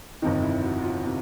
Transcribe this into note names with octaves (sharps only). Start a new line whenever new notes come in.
G1 F2 C3 D#3 D#4
E4
F#4
F4
C3 D#3 F#4